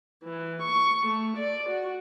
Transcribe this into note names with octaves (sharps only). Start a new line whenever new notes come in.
E3
C#6
A3
D5
F#4